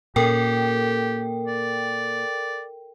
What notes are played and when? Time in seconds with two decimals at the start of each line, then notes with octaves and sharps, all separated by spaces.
0.16 A#2 C#4 G4 A4 A#4 G5
1.47 D5